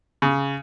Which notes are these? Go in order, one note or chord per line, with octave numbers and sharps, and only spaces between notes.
C#3